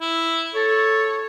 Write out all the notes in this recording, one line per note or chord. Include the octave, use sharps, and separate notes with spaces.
E4
A4 C#5